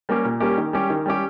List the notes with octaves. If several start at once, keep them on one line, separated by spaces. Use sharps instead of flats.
G3 A#3 C#4 G4
A#2
G3 A#3 C#4 G4
D#3
G3 C#4 G4
D#3
G3 C#4 G4